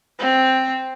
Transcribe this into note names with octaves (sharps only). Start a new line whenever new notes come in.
C4